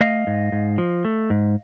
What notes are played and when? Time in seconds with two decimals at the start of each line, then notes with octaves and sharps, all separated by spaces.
0.01 A3 D#5 F5
0.27 G#2
0.52 G#2
0.78 F3
1.05 A3
1.30 G#2